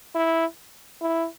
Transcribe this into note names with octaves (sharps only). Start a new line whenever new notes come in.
E4
E4